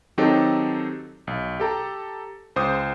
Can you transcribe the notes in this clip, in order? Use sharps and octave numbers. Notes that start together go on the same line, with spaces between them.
D#3 F#3 C4 D#4 G4 A4
B1
G4 A4 A#5
C#2 C5 D6 D#6